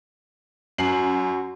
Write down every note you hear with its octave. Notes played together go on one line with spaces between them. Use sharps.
F#2 F#4 C7 F#7